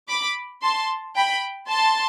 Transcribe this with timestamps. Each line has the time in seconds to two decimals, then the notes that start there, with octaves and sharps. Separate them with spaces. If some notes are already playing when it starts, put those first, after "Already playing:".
0.09 B5 D6
0.62 A5 C6
1.16 G5 B5
1.69 A5 C6